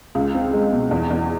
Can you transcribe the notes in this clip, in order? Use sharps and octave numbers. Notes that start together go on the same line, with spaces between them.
C#2
C4
G#3
B2
E2
E2